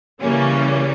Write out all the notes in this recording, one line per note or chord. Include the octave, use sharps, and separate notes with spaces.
C#3 E3 G3 A#3 C#4